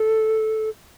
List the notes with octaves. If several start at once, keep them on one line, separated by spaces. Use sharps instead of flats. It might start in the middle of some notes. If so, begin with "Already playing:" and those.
Already playing: A4